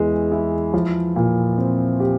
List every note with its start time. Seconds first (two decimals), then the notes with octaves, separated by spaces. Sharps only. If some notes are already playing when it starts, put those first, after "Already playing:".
Already playing: E2 E3 G#3
0.32 E4
0.74 F3
1.16 A#2
1.58 C4
2.00 G4